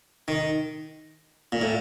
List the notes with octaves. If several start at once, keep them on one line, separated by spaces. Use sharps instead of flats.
D#3
A#2
A2